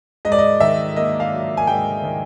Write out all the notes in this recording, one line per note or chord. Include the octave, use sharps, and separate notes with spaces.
G#2 D#5
D5
D#5
D#3 E5
A#3 D#5
F5
F#3
G#5
G#2 G5
D#3